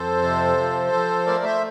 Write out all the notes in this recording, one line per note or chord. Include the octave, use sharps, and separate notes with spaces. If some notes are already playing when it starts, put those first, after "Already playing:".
Already playing: F2 A4 C5
C3
F3
F3
A3 A#4 D5
C5 E5